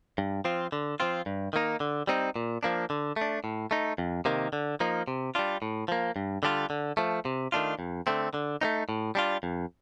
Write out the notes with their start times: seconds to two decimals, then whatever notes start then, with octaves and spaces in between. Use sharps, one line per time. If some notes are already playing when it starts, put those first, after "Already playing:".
0.18 G2
0.45 F3 C4 F4
0.72 D3
1.00 F3 C4 F4
1.26 G2
1.53 D#3 A#3 D#4
1.80 D3
2.07 G3 C4 D#4
2.36 A#2
2.63 F3 A#3 D4
2.90 D3
3.16 A3
3.21 D4
3.44 A2
3.71 A3 D#4
3.98 F2
4.25 C3 D#3 A#3
4.53 D3
4.80 F3 A#3 D#4
5.08 C3
5.35 G3 D4 F4
5.62 A2
5.88 F3 A#3
6.16 G2
6.43 D3 G3 D4 F4
6.70 D3
6.97 F3 A3
7.25 C3
7.52 D#3 A3 D4 F4
7.79 F2
8.07 D3 A3 C4
8.34 D3
8.61 A3 C4 D#4
8.89 A2
9.15 G3 D4 F4
9.43 F2